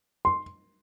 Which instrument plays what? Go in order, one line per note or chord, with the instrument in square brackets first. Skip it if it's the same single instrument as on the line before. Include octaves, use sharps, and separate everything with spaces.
[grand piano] C6